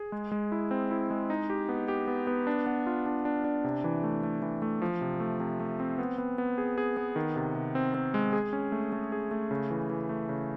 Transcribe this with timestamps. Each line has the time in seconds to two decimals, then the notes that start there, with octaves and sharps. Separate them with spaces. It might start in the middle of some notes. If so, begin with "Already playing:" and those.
Already playing: G#4
0.12 G#3
0.32 G#3
0.52 E4
0.71 C4
0.91 E4
1.10 G#3
1.30 D#4
1.50 G4
1.69 B3
1.88 G4
2.08 B3
2.27 B3
2.47 D4
2.66 B3
2.86 F4
3.06 D4
3.25 D4
3.44 D4
3.64 C3
3.84 E3
4.04 A3
4.23 A3
4.42 E3
4.62 A3
4.82 F3
5.01 C3
5.20 A3
5.40 C3
5.60 A3
5.80 C4
5.98 B3
6.18 B3
6.38 B3
6.58 G#4
6.78 G#4
6.97 B3
7.16 D#3
7.36 C3
7.55 C3
7.75 C4
7.94 C4
8.14 G#3
8.33 G#4
8.53 C#4
8.72 A3
8.92 A3
9.12 G#4
9.31 A3
9.51 C#3
9.71 E3
9.90 E3
10.09 A3
10.29 C#3